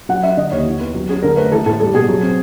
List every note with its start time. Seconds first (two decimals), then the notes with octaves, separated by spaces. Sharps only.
0.09 F#3 F#5
0.23 C#4 E5
0.37 D3 D#5
0.52 D#2 C#5
0.66 E3
0.81 B3
0.95 F#3
1.09 C#4 G#4
1.23 D3 A#4
1.37 A3 B4
1.52 E3 A4
1.66 A2 A4
1.80 G3 A4
1.94 B2 G#4
2.08 F#3
2.22 C4